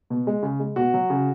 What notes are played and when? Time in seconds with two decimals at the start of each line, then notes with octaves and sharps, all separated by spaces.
0.10 B2
0.27 G#3
0.43 C#3
0.60 G#3
0.76 B2 F#4
0.94 F#3
1.10 C#3